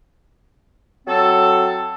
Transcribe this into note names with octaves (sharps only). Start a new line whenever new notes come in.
F#3 C4 A4